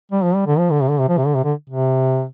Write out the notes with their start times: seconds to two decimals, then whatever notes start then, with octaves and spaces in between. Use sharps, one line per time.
0.12 G3
0.23 F3
0.35 G3
0.47 D3
0.58 F3
0.70 D3
0.82 C3
0.90 D3
1.00 C3
1.09 F3
1.17 C3
1.26 D3
1.35 C3
1.44 D3
1.70 C3